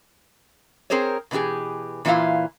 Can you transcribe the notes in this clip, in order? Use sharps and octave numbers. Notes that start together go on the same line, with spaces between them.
C4 G#4 A#4 C5 C#5
B2 E3 C#4 G4 G#4
A#2 E3 B3 E4 F4 F5